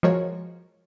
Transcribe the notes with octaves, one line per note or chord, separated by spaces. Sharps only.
F3 G#3 F#4 A#4 C#5